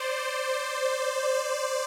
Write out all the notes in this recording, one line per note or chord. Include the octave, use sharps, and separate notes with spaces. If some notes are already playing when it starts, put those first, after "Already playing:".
Already playing: C5 D5